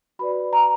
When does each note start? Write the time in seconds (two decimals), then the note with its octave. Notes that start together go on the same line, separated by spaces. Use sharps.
0.19 F#4 B4 D5 B5
0.53 A#5